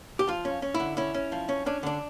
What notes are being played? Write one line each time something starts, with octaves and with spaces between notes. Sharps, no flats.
G4
F3 F4
C#4
C#4
E4
D3
C#4 E4
C#4
F3
C#4
C#4 D4
D3 D4